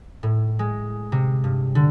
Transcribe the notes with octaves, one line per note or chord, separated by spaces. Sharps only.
A2
G#3
C3
G2
D3